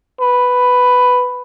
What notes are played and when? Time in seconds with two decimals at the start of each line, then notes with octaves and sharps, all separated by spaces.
0.21 B4